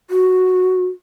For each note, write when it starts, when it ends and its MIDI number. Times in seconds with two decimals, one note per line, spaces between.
0.10 0.85 66